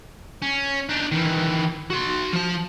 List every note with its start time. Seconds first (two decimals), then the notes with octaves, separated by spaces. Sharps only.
0.42 C#4
0.89 D4 D#4
1.11 D#3 E3
1.90 F#4 C6
2.33 F3 A5